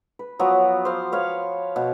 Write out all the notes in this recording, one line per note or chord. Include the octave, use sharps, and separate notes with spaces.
B4
F3 F#3 B3
C5 F5
B4 C#5 F5
B2